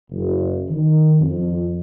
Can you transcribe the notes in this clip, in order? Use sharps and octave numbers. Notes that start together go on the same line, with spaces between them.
F#1
D#3
F2